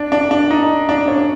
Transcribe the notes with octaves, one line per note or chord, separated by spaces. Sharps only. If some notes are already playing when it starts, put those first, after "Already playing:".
Already playing: D4
D4
D4
D#4
D4
C#4
D4